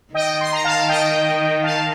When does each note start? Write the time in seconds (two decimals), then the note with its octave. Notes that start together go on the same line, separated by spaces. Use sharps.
0.14 D#3 D#5 G5
0.41 C6
0.53 A#5
0.64 F5 A5
0.88 D#5 G5
1.63 F5 A5